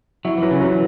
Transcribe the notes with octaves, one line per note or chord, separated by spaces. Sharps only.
F#3 E4
E3 F#3
C#3
E3 F#3